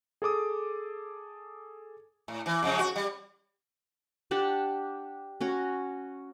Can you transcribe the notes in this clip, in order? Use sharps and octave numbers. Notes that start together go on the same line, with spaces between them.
G#4 A4 D6 D#6
A2
E3
F2 C#3 G#3
F#4
G3
D4 G4 F#5 A5
C#4 F#4 C#5 A#5